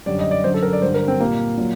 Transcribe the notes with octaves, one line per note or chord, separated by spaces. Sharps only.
F#2 D3 G3 D5
D#5
D5
F#2 D3 F#3 C5
A4
A#4
D5
G2 D3 G3 C5
A#4
C4
A#2 G3 A#3
A#2 F#3